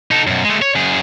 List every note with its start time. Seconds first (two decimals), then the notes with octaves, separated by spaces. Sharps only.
0.11 D#4 A4
0.27 F#2 B2
0.45 G#3 A3
0.62 C#5
0.76 F#2 G#4